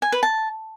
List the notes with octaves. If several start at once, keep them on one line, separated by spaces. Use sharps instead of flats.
G#5
B4
A5